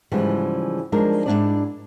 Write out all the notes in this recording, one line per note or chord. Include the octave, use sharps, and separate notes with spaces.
G#2 C#3 E3 F3 G3
F3 G3 G#3 D4 D#4 A#4
G#2 C#3 D4 E4 D5